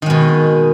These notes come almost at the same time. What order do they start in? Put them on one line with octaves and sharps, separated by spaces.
D#3 G#3 B2